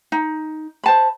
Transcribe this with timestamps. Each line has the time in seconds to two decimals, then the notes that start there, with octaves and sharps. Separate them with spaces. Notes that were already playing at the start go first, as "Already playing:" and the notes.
0.12 D#4
0.84 C5 A5 B5